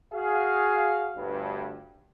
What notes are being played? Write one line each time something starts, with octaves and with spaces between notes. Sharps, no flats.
F#4 G#4 F5
G1 D2 G2